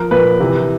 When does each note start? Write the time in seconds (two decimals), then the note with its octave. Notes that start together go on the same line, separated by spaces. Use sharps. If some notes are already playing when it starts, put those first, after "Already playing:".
Already playing: F3 A#4
0.11 A#2 F3 B4
0.40 C3 E3